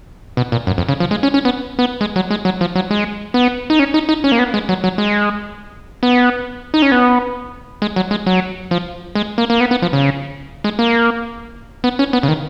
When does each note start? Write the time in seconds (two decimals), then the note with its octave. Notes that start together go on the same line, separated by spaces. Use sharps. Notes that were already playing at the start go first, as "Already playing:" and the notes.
0.37 B2
0.52 A#2
0.67 F#2
0.78 F2
0.89 C#3
1.00 F3
1.11 G#3
1.23 C#4
1.34 C#4
1.45 B3
1.79 B3
2.01 G#3
2.16 F#3
2.31 G#3
2.45 F#3
2.61 F3
2.75 F#3
2.91 G#3
3.34 B3
3.70 D#4
3.79 C#4
3.94 D#4
4.09 D#4
4.24 C#4
4.32 A#3
4.39 B3
4.54 G#3
4.69 F#3
4.84 F#3
4.98 G#3
6.03 B3
6.74 D#4
6.82 C#4
6.92 B3
7.82 G#3
7.96 F#3
8.11 G#3
8.26 F#3
8.71 F3
9.15 G#3
9.38 A#3
9.50 A#3
9.60 B3
9.71 B3
9.82 F3
9.93 C#3
10.64 G#3
10.79 A#3
11.84 B3
11.99 C#4
12.13 B3
12.23 C#3
12.28 D#3